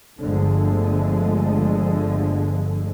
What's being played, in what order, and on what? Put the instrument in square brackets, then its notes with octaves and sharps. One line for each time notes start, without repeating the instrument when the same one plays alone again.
[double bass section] G1 D3 F3 G#3 A3